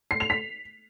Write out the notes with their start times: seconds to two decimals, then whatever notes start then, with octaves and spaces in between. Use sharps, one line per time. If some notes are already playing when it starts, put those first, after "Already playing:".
0.11 C7
0.20 F7
0.30 B6